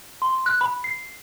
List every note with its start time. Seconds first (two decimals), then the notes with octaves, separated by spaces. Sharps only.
0.22 C6
0.46 F#6
0.61 B5
0.84 C7